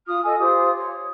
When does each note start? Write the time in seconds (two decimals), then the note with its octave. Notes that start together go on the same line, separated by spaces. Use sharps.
0.07 F4 D#6 F6
0.25 A4 D#5 G#5
0.39 F4 G4 C5 D#6
0.76 C#5